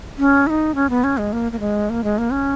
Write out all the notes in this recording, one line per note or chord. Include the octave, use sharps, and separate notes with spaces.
C#4
E4
D#4
C#4
B3
C#4
G#3
A#3
A#3
G#3
A#3
G#3
A#3
C#4